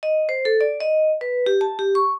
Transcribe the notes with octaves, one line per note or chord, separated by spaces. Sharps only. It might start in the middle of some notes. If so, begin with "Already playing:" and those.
D#5
C5
A4
D5
D#5
B4
G4
A5
G4
C#6